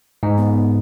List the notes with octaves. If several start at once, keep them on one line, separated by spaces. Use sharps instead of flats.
G#2
B3